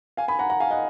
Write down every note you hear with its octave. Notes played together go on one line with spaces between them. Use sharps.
F5 G#5
G#5 B5
F#5 A#5
F#5 A#5
F5 G#5
D#5 F#5